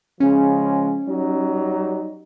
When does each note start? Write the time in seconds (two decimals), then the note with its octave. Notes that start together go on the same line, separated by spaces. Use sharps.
0.20 C#3 F3 G#3 C#4
1.08 F#3 G3 D#4